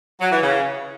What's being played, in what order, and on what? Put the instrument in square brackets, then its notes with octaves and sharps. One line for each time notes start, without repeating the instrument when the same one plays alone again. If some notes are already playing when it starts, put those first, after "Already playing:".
[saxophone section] F#3
E3
C#3